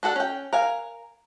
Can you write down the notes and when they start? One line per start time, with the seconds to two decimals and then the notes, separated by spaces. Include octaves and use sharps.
0.03 D4 F#4 A4 F#5
0.16 C#4 G5
0.53 A#4 F5 G#5